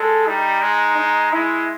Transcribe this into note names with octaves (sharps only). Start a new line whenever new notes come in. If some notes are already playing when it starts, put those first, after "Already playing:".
Already playing: G#3 A4
G3 D#4
G#3
D#4
G#3 E4